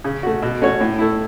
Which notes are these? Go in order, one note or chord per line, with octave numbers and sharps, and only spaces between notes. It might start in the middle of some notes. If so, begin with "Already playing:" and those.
C#3
A3 F#4
B2
A3 C#4 F#4 C#5
A2
A3 E4